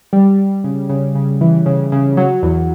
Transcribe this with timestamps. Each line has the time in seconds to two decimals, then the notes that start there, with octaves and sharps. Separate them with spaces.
0.13 G3
0.39 G3
0.64 C#3
0.89 C#3
1.15 C#3
1.41 E3
1.66 C#3
1.92 C#3
2.17 F#3
2.43 E2